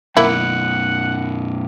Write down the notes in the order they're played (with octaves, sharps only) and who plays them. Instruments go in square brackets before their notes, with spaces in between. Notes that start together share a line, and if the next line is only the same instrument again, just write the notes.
[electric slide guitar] F#2 B2 [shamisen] A#3 E4 [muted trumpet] F#5